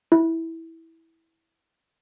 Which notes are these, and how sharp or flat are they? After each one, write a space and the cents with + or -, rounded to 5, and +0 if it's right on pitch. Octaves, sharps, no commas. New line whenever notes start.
E4 -10